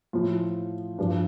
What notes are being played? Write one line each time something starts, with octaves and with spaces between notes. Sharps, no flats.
A2 F3 F4
G2 F3 D4